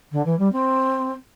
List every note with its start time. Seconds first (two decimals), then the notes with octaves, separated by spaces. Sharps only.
0.12 D3
0.25 E3
0.38 G3
0.52 C4